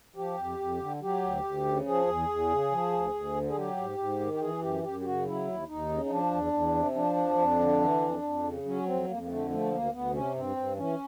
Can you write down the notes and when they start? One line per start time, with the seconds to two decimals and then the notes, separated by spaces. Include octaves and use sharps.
0.16 F3 G4
0.38 F2
0.59 F2
0.80 D3
1.02 F#3 G4
1.23 D2
1.44 D2
1.65 C#3
1.86 F3 G#4
2.07 E2
2.29 E2
2.50 C#3
2.72 F3
2.92 D2
3.14 D2
3.35 D3
3.49 G#4
3.56 F#3 G4
3.77 G#2
3.98 G#2
4.20 D#3
4.34 G4
4.41 E3 G#4
4.61 F#2 G4
4.83 F#2 G4
5.00 G4
5.05 C#3 F#4
5.25 F#3 E4
5.47 D#2
5.68 D#2 D#4
5.89 C#3
6.05 D#4
6.10 F3 D4
6.31 E2
6.53 E2
6.74 C3
6.95 F3 D4
7.16 F2
7.38 F2
7.60 D3
7.80 E3
8.01 F2
8.23 F2
8.44 C#3
8.65 F#3 C#4
8.86 F2 C4
9.07 F2 A#3
9.23 A#3
9.29 D3 A3
9.50 F3 A3
9.71 D2 A#3
9.92 D2 B3
10.13 C3 C#4
10.35 G2 C4
10.56 G2
10.77 E3 C#4